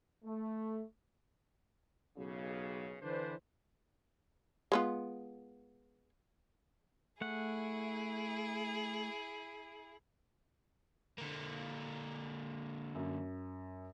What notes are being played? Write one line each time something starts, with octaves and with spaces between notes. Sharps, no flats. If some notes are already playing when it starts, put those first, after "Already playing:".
A3
B1 C#3
D3 E3 D4 B4 C5
G#3 B3 F4
A3 E4 G#4 F#5
D3 A#3
F#2